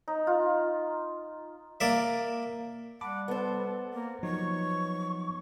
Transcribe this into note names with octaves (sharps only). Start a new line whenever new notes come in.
D#4
F4
A#3 D5 E5
G3 F#5 A5 B5 D6
B3 A4 C5
A#3 A#4
F3 F#3 D#4 C#5 C#6